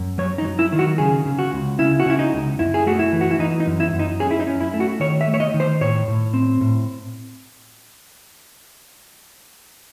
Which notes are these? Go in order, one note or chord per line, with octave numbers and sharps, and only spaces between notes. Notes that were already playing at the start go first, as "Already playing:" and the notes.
Already playing: F#2
F#3 C#5
D#4
F#3
E4
D#3
F#4
C#3 G#4
C#3
F#4
C#2
C#3 E4
F#4
C#3 E4
D#4
C#2
F#2 E4
G#4
A3 F#4
E4
E3
F#4
E4
E3 D#4
D#4
F#2
E4
F#2
D#4
C#4 G#4
E4
D#4
C#4
E4
A3
F#4
D#3 C#5
E5
A3
C#5
D#5
D#3
C5
A2 C#5
A2
C4
A2